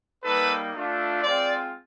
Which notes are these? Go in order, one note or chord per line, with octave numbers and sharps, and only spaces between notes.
G3 A#3 D#4 A4 B4
A3 D4 F4
G#3 C4 F4 C5 D5